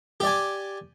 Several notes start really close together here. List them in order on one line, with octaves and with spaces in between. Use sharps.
G4 D5 G#5